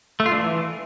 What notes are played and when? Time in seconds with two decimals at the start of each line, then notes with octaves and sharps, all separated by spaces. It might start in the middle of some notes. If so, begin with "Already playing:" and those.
0.20 A3
0.26 F4
0.32 D4
0.38 E3